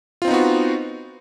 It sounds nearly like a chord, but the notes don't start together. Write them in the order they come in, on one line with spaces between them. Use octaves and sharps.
F4 C4 D#4 B3 F#4